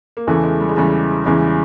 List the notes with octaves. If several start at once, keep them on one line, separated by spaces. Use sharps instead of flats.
A#3
E2 C#3 E3 A3
G#3
G3
G#3
E2 C#3 E3 G3
E2 C#3 E3 G#3
G3